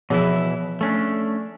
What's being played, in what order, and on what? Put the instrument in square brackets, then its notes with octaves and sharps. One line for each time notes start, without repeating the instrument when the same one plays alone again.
[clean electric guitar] B2 E3 E4 [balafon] F3 G#4
[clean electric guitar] A3 C#4 D4